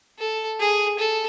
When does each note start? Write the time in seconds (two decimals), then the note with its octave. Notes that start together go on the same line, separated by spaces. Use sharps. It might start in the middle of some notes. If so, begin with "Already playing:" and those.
0.19 A4
0.59 G#4
0.99 A4